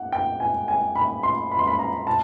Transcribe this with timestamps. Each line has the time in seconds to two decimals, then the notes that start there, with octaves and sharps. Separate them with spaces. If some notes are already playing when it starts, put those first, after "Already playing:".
Already playing: F#5
0.12 G5
0.40 G#5
0.68 G#5
0.95 B5
1.23 C6
1.51 B5
1.59 C6
1.67 B5
1.79 A#5
2.07 A5